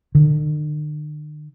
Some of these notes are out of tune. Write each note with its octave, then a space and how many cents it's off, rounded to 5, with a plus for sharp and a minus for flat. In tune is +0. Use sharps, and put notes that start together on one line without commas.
D3 +45